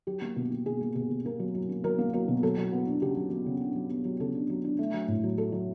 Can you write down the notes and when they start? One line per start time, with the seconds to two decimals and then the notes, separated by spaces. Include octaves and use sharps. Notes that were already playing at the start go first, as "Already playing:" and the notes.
0.07 F#3 G4
0.22 A#3
0.36 B2
0.51 A#3
0.65 B2 G#4
0.81 A#3
0.95 B2 G#4
1.10 B2
1.25 A#3 A#4
1.39 F#3
1.55 F#3
1.69 A#3
1.84 F#3 A#4
1.99 A#3
2.13 F#3 A#4
2.28 B2
2.43 F#3 A4
2.58 F#3
2.72 B3
2.87 D4
3.02 C#3 G4
3.17 F#3
3.31 F#3
3.46 C#3
3.61 D4
3.75 F#3
3.90 B3
4.05 F#3
4.20 C#3 A4
4.35 D4
4.50 F#3
4.64 D4
4.79 A3
4.94 F#3
5.08 A2
5.23 F#3
5.38 F#3 A4
5.52 F#3